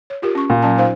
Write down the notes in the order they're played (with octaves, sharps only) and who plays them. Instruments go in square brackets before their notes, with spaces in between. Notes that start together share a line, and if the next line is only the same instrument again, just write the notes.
[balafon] C#5
F4 G4 A#4
C#4 C#6
[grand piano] A#2
[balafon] F#3 C#4 A5
D#4 C5 F5